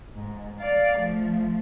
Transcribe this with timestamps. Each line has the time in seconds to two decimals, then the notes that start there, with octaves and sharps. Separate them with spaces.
0.15 G#2
0.61 D5 F5
0.98 F3 A3